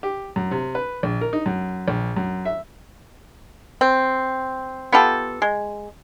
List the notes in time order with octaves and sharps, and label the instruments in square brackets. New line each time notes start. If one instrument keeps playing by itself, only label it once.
[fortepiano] G4
F#2
C3
B4
A#1
A#4
D#4
F#2
A#1
F#2
E5
[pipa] C4
B3 F4 G4 A4
G#3